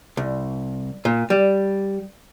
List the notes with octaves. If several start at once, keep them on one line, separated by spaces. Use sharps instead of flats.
C2
A#2
G3